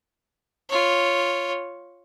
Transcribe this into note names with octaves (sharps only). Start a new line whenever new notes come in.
F4 C#5